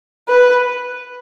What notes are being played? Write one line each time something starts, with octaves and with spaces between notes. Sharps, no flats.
B4